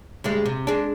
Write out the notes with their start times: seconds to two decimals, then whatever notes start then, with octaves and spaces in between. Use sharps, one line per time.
0.24 D2 G3 G#3
0.46 C3
0.67 G#3 D4